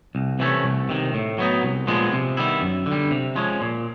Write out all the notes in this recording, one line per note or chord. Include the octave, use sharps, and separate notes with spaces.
C2
C3 E3 A3 C#4
C2
C3 D#3
A2
F#3 B3 D#4
C2
A#2 F3 G#3 B3
C3
D#3 G3 B3 E4
F#2
D3
G3
C3
F3 G#3 C#4
A#2